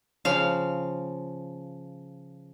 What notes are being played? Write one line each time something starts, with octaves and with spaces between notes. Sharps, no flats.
C#3 F3 F5